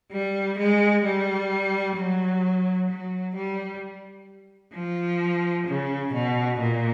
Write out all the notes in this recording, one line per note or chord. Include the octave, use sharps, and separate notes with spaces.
G3
G#3
G3
F#3
F#3
G3
F3
C#3
B2
A#2